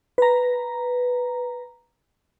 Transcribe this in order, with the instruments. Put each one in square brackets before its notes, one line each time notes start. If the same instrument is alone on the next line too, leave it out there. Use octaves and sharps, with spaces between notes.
[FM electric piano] B4 A#5